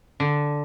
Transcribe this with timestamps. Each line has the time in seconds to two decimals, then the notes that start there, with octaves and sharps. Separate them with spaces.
0.20 D3